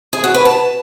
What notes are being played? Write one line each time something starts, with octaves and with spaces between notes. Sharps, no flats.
G#4
F#4
B4
A5